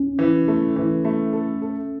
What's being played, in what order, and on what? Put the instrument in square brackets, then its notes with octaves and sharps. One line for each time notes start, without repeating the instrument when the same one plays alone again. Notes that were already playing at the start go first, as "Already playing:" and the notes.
Already playing: [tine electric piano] C#4
[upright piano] E3
A3
E3
A3
A4
A4